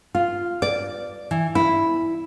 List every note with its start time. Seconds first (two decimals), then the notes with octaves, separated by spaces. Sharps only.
0.15 F4
0.62 D5
1.31 E3
1.55 E4